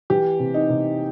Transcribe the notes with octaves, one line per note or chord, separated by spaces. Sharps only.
E3 G4
C3
D#4
C3